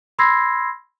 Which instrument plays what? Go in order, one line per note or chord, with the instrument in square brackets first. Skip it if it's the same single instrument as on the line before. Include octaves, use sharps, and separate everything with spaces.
[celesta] B5 C6 E6 G#6 A#6 C7